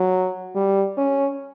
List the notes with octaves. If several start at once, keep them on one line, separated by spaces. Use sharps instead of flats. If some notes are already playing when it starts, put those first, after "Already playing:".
Already playing: F#3
G3
C#4